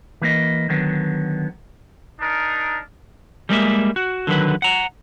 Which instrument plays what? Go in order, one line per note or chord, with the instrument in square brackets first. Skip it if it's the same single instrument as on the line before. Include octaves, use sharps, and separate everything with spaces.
[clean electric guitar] E3 A#3 D#5
D3 D#3 F#3 B3
[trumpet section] D4 D#4 A#4
[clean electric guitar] G3 G#3 A#3 E5
F#4
D3 D#3 F#3 B4
F#5 A#5